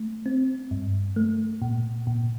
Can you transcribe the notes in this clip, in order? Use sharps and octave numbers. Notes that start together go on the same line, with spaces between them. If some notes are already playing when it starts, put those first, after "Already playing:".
Already playing: A3
C4
G2
A3
A#2
A#2